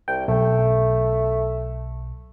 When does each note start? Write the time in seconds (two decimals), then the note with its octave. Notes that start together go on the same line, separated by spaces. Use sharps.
0.08 C2 G5
0.28 B1 A3